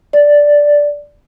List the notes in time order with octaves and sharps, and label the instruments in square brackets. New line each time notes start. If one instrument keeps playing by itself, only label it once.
[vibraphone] D5